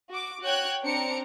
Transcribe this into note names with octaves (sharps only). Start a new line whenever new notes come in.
F#4 D6
F#4 C#5 G5 F#6 G#6
C4 D4 A#5 C#7 D7